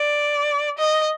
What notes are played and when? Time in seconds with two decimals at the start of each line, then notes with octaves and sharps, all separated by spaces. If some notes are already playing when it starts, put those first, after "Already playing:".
Already playing: D5
0.78 D#5